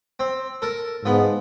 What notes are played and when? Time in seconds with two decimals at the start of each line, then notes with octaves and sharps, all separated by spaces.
0.20 C4
0.62 A4 A#4
1.05 G#2 F3 B3